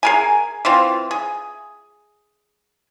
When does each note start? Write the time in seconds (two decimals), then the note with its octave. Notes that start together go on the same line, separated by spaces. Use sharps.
0.03 G#4 A#4 G#5
0.65 E3 C4 F4
1.11 G#4